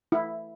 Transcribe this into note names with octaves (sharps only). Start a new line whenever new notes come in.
E4